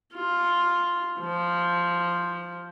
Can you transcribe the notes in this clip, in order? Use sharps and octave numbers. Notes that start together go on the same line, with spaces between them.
F4
F3